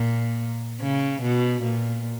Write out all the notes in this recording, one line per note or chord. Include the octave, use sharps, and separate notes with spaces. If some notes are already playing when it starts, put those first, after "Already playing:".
Already playing: A#2
C#3
B2
A#2